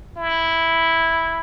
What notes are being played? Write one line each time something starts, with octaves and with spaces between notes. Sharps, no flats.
E4